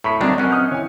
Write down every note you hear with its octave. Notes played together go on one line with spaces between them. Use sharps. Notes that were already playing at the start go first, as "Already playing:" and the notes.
A2 B5 C#6 B6
D2 D#3 F#3 G3 C4 D4
F#2 C4 C#4 D#5 F#5
D#6 F6 G6
E3 C#5 G#5